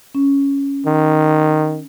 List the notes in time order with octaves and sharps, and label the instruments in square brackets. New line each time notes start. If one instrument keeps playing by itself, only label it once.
[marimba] C#4
[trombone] D#3